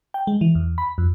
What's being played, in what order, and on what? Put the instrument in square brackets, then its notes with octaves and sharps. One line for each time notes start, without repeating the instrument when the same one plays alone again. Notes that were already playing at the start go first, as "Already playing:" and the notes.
[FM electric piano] G5
G#3
E3
E2
B5
F2